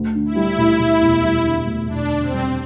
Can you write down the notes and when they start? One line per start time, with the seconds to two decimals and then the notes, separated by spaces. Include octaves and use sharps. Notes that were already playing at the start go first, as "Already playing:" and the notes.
Already playing: D2
0.15 D3
0.26 E4
0.36 G3
0.58 D2
0.79 D2
1.02 E1
1.23 G3
1.45 D3
1.66 D2
1.88 E1 D4
2.10 D3
2.21 C4
2.32 G3